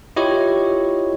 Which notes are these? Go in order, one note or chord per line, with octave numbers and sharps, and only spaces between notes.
E4 F4 G4 C#5 D#5 C#6